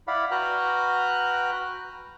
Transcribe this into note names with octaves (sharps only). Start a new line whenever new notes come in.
E4 D5 F5 F#5 B5
F#4 B4 G5 A#5 F6 F#6